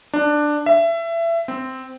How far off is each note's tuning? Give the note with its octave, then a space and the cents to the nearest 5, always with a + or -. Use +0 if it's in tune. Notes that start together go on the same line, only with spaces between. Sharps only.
D4 +10
E5 +25
C4 -10